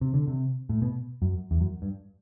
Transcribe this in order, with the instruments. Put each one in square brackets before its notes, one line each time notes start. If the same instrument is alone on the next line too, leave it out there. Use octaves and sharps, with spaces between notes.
[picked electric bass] C3
D3
C3
A2
B2
F#2
E2
F#2
G2